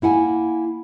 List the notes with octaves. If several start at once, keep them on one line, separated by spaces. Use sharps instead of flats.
A#3 E4 F#5 G#5